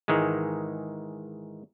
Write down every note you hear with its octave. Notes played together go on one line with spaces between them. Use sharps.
G#2 D#3 E3 G#3